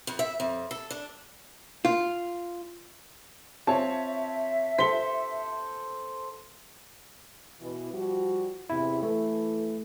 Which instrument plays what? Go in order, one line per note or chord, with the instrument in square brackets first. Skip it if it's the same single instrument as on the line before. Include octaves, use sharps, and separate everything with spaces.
[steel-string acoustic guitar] F2
E5
F2
A4
D4
[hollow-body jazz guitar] F4
[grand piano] C4 F4 C#5 [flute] E5 [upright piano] A5
[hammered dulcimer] A4 C5 [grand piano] B6 G7
[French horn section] B2 E3
F3 G3 F#4
[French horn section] E2 C3 [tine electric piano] E4
[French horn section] E3 A4 [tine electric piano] A3